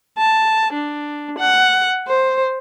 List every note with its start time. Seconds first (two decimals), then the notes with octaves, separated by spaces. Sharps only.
0.17 A5
0.73 D4
1.39 F#5
2.07 C5